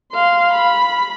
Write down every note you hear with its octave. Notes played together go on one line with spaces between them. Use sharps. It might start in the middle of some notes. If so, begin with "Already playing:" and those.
F5 C6
B5